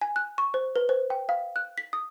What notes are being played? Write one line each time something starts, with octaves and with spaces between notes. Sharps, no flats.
G#5
F#6
C#6
C5
B4
C5
G5
F5
F#6
B6
D#6